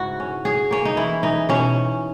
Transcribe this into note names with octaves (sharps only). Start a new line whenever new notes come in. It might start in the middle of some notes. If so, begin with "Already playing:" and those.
Already playing: G#2 C#3 E4 F#4
C#4
C#4 G#4
A#3 C#4
D#4
E3 E4
E3 D#4
B2 C#4